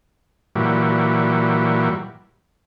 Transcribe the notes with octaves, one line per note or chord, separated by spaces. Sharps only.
A#2 E3 F#3 G3